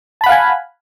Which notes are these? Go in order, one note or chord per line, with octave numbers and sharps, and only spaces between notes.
F5 F#5 G#5 A5 B5